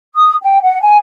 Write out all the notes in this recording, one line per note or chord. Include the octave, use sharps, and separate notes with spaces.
D#6
G5
F#5
G#5